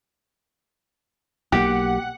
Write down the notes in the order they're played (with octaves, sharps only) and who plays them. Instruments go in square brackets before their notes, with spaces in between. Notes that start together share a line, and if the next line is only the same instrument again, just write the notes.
[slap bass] B1 A#3 [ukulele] G4 [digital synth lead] F#5